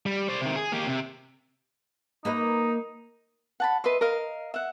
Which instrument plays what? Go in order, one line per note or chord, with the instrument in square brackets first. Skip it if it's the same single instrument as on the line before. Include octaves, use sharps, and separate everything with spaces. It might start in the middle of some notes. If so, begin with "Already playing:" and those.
[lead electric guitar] G3
C5 D5
C3 D#3
G#4
A#3 G4
C3
[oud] A#3 B4 D#5 [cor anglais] D#4
[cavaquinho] F#5 A5 B5
B4 D#5 E5 C6
A#4 D#5 F5
E5 F#5